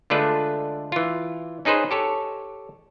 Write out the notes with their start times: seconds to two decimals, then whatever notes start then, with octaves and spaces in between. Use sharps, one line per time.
0.10 D3 G#3 A3 D4 F4 B4
0.92 E3 F4
1.65 C#4 D#4 G#4 B4 C5
1.91 G4 A4 C#5